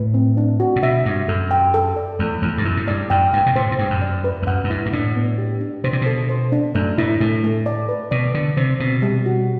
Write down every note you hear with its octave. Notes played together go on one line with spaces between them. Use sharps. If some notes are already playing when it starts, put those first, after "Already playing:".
Already playing: A2 B4
C4
D4
F#4
A2
B2 E5
G2 E5
F#2 A4
G5
A4
D5
E2 A3
E2 A3
G2
F#2 E4
A2
G2 D5
F#2 G5
G2 G5
B2
A2 C5
A2
G2 G5
F#2
D5
B4
E2
F#2 F#5
F#2
G2 E4
G2
A2 D4
B3
G4
D4
B2 C5
C3
B2 A4
C5
D4
F#2 A3
A2 E4
A2 A3
A3
D5
B4
B2 D5
D3 D5
C3 C5
B2 C4
G3
F#4